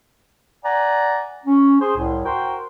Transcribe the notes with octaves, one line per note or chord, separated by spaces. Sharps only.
D5 F#5 G#5 A#5
C#4
G#4 C5
C2 A2
F#4 A#4 C5 G5